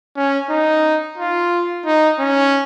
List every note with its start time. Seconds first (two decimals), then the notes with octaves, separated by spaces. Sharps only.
0.16 C#4
0.50 D#4
1.18 F4
1.86 D#4
2.20 C#4